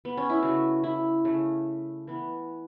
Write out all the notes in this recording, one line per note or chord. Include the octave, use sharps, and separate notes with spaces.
B3
C#4
E4
C#3 A3 F#4
E4
C#3 A3
E3 B3